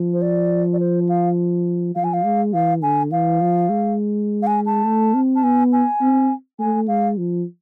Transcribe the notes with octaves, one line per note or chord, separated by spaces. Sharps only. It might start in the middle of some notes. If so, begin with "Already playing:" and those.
Already playing: F3
C5
D5
D5
C5
F5
F3 F5
G#5
F5
G#3
E3 F5
D3 G#5
E3 F5
F3
G#3
F5
G#5
A5
A3
C4
A5
B3 G#5
G#5
C4
A3 G#5
G#3 F5
F3